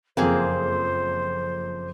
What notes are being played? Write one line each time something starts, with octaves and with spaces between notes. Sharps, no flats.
F#1 F2 A#3 C4 G#4 C5